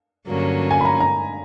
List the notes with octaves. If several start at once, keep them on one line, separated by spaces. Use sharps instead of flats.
G2 D3 F#3 A#3 C#4
G#5
B5
A#5
A#5